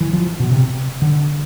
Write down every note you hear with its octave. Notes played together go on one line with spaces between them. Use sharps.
E3
F3
B2
C3
D3